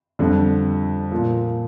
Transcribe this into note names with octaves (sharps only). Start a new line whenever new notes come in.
F2 D3 G3
A#2 F3